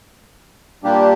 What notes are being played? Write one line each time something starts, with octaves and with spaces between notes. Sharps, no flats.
A#2 G3 A#3 D4 G4